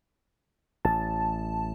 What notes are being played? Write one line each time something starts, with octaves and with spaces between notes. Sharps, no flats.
A1 A5